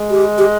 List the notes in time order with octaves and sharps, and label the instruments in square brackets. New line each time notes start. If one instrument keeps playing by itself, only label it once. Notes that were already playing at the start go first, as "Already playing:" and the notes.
Already playing: [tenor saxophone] G#3
[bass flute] G4
G4